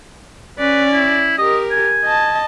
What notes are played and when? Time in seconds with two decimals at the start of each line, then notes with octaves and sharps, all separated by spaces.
0.59 C#4 B4 D5
0.92 E4
1.38 G4 A#4 D#5
1.71 G#5
2.05 D#5 A5